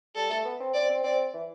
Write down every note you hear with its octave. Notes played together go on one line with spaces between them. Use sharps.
G3 A4
A3
B3
C4
C4 D5
C4
C4 D5
E3